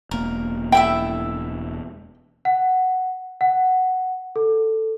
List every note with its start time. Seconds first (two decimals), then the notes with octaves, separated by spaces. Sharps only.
0.11 E1 A#3 A#4
0.72 E4 A4 E5 G5
2.45 F#5
3.41 F#5
4.36 A4